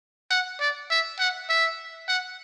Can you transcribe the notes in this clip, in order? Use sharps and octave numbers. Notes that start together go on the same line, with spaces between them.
F#5
D5
E5
F#5
E5
F#5